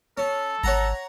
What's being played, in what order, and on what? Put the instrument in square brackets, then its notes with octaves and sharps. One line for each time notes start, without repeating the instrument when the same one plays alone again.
[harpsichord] C#4 [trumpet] A4
[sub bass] G#1 [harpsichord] C#5 F#5 A#5